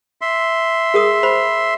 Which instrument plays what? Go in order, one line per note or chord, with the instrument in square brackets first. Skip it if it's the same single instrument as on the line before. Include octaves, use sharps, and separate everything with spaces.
[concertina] E5 C6
[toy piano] G#4 A#4 D#6
C5 B5